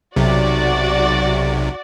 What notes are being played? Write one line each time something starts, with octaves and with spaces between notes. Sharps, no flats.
B1 C3 F#4 D5